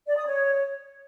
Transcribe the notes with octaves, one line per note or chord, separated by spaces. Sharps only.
D5
D#6
C#5